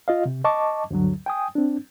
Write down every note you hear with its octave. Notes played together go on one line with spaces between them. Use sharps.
F4 D#5 F5
C3
D#5 A5 C#6 D6
D2 G2 D3 F#3
G5 G#5 D#6
C4 D4